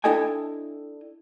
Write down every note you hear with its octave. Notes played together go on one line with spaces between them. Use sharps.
D4 E4 A4 D#5 G5 G#5